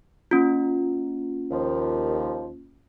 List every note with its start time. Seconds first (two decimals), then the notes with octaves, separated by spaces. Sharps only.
0.31 A#3 C#4 F4
1.51 D#2 F3